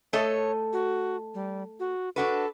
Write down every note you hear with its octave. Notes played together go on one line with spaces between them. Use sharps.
A3 A4 C#5 D#5
F#4
G3
F#4
D4 F#4 A4 B4